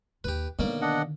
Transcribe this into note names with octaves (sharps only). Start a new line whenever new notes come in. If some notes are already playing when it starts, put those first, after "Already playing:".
D#2 G4 B4
B1 D3 D#3 A#3 D5
D4 D#5 F#5